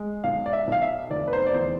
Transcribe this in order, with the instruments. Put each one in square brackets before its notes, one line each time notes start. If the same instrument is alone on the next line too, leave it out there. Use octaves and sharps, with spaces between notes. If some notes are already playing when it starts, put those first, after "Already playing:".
Already playing: [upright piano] G#3
B1 F5
D5
E5
B1 F5
E5
F1 D5
B4
C5
D5
E2 C5